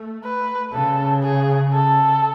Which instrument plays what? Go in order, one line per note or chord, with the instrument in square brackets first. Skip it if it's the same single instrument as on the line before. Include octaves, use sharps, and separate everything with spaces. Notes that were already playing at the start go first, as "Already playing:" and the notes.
Already playing: [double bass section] A3
[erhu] B4
[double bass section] C#3 [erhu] A4
[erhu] G#4
A4